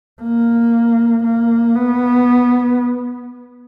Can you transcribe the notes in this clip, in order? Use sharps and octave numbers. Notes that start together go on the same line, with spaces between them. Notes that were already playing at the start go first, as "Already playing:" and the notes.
A#3
A#3
B3